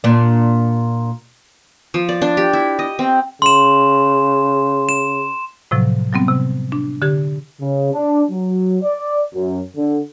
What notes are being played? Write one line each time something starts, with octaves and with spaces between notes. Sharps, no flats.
A#2 D4
F3
D5
D4
G4
E4
D#5
C4
C#3 C6 E7
E7
A2 C3 F3 F#3
F#3 G3 B3 C4
C3
D4
D3 G4 G#6
C#3
D4
F#3
D5
F#2
D3